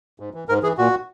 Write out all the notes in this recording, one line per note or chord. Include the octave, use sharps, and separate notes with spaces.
G#2
E3
G#2 A#4
E3 G#4
A#2 F#4